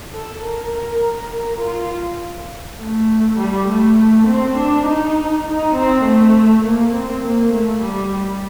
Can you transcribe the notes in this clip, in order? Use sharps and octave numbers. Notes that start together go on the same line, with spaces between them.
A4
A#4
A#4
A#4
F4
A3
G3
A3
C4
D4
D#4
D#4
C4
A3
A#3
C4
A#3
A3
G3
G3